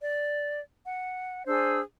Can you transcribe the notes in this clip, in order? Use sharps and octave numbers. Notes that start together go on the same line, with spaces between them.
D5
F#5
D4 G#4 C5 E6